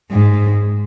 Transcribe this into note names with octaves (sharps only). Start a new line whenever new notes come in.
G#2